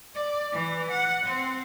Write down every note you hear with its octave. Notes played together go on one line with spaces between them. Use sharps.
D5
E3
F#5
C4